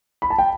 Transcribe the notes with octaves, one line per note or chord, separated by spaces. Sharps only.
B5
A5
G5